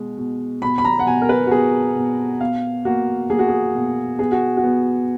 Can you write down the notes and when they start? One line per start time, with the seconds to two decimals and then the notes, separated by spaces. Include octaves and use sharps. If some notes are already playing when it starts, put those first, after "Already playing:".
Already playing: B2 G#3
0.17 B2
0.62 B2 B5
0.78 B5
0.85 A#5
0.99 F#5
1.06 B2 G#5
1.22 A#4
1.29 B4
1.47 F#4
1.51 B2 G#4
1.96 B2
2.40 B2 F5
2.85 A#3 F#4
3.30 A#3 G#4
3.39 F#4
3.48 G#4
3.75 B2
4.19 B3 G#4
4.32 F#4
4.57 F#4
4.64 B3